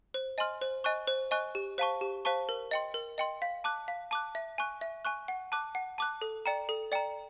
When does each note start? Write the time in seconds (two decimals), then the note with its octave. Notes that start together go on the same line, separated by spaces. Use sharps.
0.14 C5
0.38 D#5 G#5 C6 F6
0.61 C5
0.84 D#5 G#5 C#6 F#6
1.07 C5
1.31 D#5 G#5 C#6 F#6
1.55 G4
1.78 C5 F5 A5 C#6
2.01 G4
2.25 C5 F5 A5 C#6
2.49 A#4
2.71 D#5 G5 C6
2.94 A#4
3.18 D#5 G5 C6
3.42 F5
3.64 A5 D6 F#6
3.88 F5
4.11 A5 D6 F#6
4.35 E5
4.58 G#5 C#6 F#6
4.81 E5
5.05 G#5 C#6 F#6
5.28 F#5
5.52 A5 D6 F#6
5.75 F#5
5.98 A5 D6 F#6
6.22 A4
6.46 D5 G5 A#5
6.69 A4
6.92 D5 G5 A#5